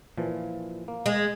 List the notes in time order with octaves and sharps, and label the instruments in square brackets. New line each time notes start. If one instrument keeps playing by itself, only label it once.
[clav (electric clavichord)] A#2 E3 F3
A#3
[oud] G#3